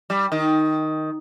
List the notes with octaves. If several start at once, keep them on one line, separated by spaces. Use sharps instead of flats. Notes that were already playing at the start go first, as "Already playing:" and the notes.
G3
D#3